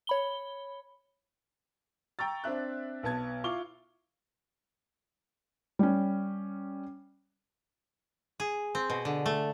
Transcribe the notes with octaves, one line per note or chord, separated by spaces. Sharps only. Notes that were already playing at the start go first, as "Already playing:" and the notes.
C#5 B5 G7
G5 A#5 C#6 E6 A6
C4 D4 E5 F#6
B1 B3 A5 G#6
E4 F4 F5 C#6 D6 G7
G3 C#4
G#4
C4
B2
D3
A3